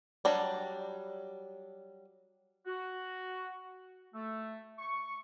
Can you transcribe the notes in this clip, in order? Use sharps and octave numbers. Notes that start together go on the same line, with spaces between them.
F#3 G3 D4
F#4
A3
C#6